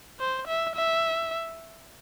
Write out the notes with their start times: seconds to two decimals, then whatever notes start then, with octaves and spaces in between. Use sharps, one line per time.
0.20 C5
0.48 E5
0.76 E5